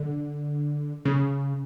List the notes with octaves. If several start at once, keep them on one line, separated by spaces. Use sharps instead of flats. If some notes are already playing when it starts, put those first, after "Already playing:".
Already playing: D3
C#3